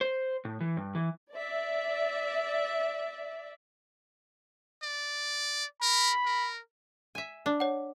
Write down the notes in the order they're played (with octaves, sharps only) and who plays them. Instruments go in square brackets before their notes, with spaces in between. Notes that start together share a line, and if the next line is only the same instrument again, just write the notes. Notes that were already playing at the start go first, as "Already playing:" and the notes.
[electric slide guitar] C5
A2
E3
G2
E3
[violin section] D5 E5
[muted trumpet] D5
[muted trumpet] A#4 [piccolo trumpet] B5
[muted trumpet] A#4
[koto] E5 G#5
D4
[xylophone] C#5 F#5